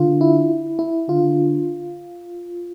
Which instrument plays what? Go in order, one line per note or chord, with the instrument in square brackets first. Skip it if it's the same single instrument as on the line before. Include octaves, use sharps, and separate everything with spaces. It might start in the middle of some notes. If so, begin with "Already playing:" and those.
Already playing: [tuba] D3 [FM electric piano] F4
[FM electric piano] E4
E4
[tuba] D3 [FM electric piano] F4